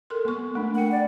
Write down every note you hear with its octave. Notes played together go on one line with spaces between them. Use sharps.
A4 A#4 C6
A#3 B3 C#6
A3 D4
A#4 F#5 G5
D5